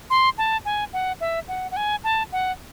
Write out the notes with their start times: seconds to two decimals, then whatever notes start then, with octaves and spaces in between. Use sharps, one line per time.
0.10 C6
0.38 A5
0.65 G#5
0.93 F#5
1.20 E5
1.48 F#5
1.71 F#5
1.76 G#5
2.04 A5
2.32 F#5